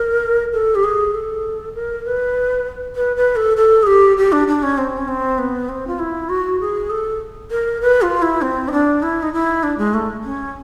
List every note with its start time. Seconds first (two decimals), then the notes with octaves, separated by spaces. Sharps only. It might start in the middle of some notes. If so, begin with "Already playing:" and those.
Already playing: A#4
0.53 A4
0.75 G4
0.84 G#4
1.14 A4
1.74 A#4
2.05 B4
2.96 B4
3.16 B4
3.36 A4
3.57 A4
3.83 G#4
3.87 G4
4.17 G4
4.32 D4
4.48 D4
4.63 C#4
4.78 C4
4.98 C#4
5.08 C4
5.38 B3
5.69 C4
5.87 F4
5.99 E4
6.29 F#4
6.60 G#4
6.90 A4
7.51 A#4
7.82 B4
8.02 F4
8.22 E4
8.42 C4
8.68 D#4
8.72 D4
9.03 E4
9.23 D#4
9.33 E4
9.63 D4
9.78 G#3
9.94 A3
10.24 C#4